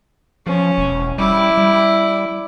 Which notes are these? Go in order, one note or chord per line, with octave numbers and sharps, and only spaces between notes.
F3 C#4
E1
G3 E4 D6
G3